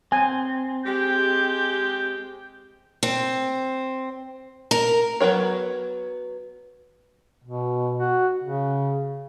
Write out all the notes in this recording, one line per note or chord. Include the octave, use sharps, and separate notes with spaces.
C4 G#5
G#3 G4 G6
C4
A#4
F#3 B3 A#4 C#5
B2
F#4
C#3